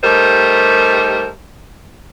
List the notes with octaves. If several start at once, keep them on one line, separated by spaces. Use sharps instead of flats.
G3 A3 D#4 G4 A#4 C5